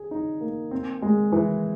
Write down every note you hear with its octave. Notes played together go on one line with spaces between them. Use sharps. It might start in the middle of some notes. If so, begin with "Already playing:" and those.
Already playing: G#4
D#4
A#3
C4
G#3
E3